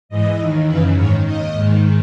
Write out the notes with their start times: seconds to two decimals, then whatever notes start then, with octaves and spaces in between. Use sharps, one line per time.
0.09 G#2 E3 D#5
0.38 D#2 D#3
0.67 F#2 C#3 E3 B4
0.96 G#2 D#3 C#5
1.24 D#2 D#3 D#5
1.54 G#2 D#3